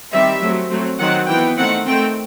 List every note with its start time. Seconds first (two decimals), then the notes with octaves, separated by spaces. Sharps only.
0.13 D#3 G3 C4 E5
0.41 F#3 A3 C4
0.71 F#3 A3 C4
1.00 D#3 F#3 C4 F#5
1.28 E3 B3 G5
1.57 D#3 A3 C4 F#5
1.86 D#3 A3 C4 G5